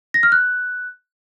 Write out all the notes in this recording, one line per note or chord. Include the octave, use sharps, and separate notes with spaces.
A#6
F6
F#6